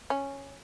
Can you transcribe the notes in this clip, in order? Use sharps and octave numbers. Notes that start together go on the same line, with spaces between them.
C#4